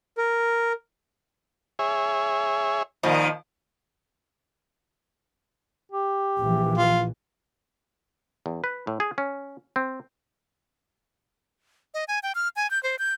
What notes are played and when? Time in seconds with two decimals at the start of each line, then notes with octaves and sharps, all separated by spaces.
0.18 A#4
1.79 G#4 C#5 E5
3.03 A#2 D#3 F3
5.92 G4
6.37 A#1 E3
6.78 F4
8.46 E2
8.64 B4
8.87 A2
9.00 G#4
9.18 C#4
9.76 C4
11.94 D#5
12.08 G#5
12.23 G5
12.35 F6
12.56 G#5
12.71 G6
12.83 C5
12.99 G6